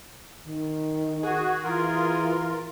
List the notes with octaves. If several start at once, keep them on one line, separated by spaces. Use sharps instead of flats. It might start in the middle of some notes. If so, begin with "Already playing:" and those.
D#3
F#4 G#4
E3 F4 A#4